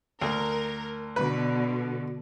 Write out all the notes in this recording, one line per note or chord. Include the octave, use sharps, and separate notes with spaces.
D2 A#4
B2 D3 B4